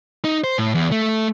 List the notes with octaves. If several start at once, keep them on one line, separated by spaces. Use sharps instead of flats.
D#4
C5
A2
E2
A3